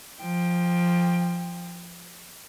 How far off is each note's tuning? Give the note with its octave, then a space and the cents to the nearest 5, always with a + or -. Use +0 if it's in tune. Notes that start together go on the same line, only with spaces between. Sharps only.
F3 +0 G5 +15